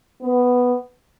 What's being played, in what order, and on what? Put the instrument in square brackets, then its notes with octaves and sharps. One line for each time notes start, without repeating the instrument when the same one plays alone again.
[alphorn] B3